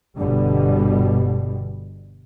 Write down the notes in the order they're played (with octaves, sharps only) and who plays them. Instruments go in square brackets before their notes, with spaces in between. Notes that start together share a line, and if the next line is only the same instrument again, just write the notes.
[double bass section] G1 B2 D3 G3